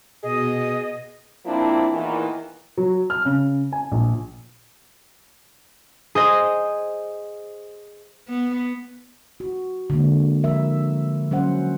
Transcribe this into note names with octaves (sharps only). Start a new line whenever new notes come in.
B2 G#4 D#5
F3 A#3 C4 D4 E4
E2 A#2 D#3 E3
F#3
F6
C#3
G#5
A#1
G#4 C5 D#5
B3
F#4
D3 G#3 A#3
F3 A#4 E5
F#3 C#4 C5 F#5